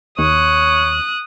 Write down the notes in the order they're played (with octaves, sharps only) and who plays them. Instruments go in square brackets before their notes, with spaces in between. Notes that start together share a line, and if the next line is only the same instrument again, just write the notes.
[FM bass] D#2 [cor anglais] C#5 [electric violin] D#6 F#6